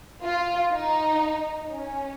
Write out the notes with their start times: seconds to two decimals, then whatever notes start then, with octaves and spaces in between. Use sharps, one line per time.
0.24 F4
0.73 D#4
1.71 C#4